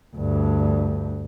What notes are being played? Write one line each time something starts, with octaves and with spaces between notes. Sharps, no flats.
D2 G2